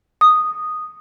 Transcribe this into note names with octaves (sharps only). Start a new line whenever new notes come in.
D#6